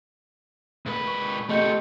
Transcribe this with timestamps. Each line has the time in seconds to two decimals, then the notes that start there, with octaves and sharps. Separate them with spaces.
0.86 G#2 B4
1.07 C#6
1.50 A3 G4 D#5 G6 C#7